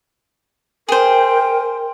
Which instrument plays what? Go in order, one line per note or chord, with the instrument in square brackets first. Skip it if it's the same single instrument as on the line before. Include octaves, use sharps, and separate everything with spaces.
[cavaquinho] G#4 C5 [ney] A#4 [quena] G5